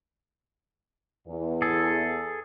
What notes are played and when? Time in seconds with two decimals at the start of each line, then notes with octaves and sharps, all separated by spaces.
1.28 E2
1.62 G#4 A4